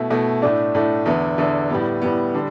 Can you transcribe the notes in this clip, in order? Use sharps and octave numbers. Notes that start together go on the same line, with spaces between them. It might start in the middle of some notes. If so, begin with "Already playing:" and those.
Already playing: B2 A3 E4
B2 A3 E4
A2 A3 D4
A2 A3 D4
E2 D3 B3 E4
E2 D3 B3 E4
A2 G3 B3
A2 G3 B3
D3 G3